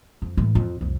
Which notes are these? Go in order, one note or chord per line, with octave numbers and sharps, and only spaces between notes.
F2
A2 E3
F2
C2 F2